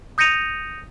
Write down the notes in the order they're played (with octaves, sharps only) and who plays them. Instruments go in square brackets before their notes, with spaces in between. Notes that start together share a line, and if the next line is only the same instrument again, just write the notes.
[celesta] D#6 G6 A#6 C#7 D#7 F7